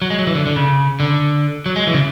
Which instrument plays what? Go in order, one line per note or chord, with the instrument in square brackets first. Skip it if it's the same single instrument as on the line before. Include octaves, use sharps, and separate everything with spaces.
[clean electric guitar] F#3
G#3
F#3
E3
D3
D3
C#3
D3
F#3
G#3
E3
C#3